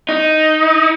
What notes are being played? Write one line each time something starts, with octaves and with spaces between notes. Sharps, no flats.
D#4